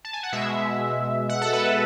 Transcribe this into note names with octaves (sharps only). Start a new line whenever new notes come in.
A5
G#5
F#5
B2 G#3 E5
F#5
A4
B4